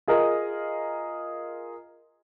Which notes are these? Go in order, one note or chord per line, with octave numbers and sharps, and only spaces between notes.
F4 G#4 A#4 D#5